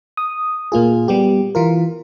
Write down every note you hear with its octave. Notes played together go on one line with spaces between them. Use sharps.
D#6
A#2 A#3 F4 G#4
G3 B3 G4
E3 F4 A#4